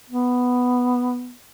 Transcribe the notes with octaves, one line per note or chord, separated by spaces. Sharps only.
B3